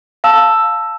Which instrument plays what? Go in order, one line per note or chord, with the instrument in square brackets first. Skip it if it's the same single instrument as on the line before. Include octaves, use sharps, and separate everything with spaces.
[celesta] F5 A5 E6 E7